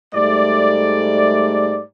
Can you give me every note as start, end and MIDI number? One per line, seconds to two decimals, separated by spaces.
0.14 1.79 44
0.14 1.79 55
0.14 1.79 57
0.14 1.84 74